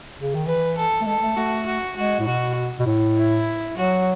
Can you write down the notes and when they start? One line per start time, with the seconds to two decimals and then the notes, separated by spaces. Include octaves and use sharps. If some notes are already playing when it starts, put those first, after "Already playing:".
0.21 C#3
0.34 D#3
0.46 E3 B4
0.77 A4
1.01 A3
1.06 G#3 A4
1.22 A3
1.37 A3 F#4
1.66 F#4
1.96 G#3 F#4
2.20 A2
2.26 B2 F#4
2.79 B2
2.86 A2
3.17 E4
3.77 F#3 F#4